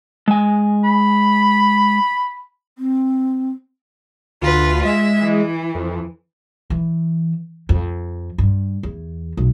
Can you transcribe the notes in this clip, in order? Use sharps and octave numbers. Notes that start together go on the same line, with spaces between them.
G#3 G#5
B5
C4
D2 F4 B4
G#3 E5
E3
F2
E3
F2
G2
E2
B1